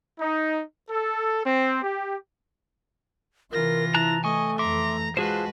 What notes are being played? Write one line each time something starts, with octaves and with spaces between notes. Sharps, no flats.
D#4
A4
C4
G4
C3 E3 F4 A#4 A#6
E4 A5 A#5 F#6
A3 D#5 G#5 C#6
F2 E3 E5 A#5 C6 D6
G#3 F4 F#4 G#4 B4 C5 A5